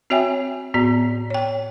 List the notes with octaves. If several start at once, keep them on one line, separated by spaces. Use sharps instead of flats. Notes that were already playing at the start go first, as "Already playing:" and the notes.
C4 F#4 C#5 E5 G5 G#5
A2 B3 F#4 D5
C#5 G5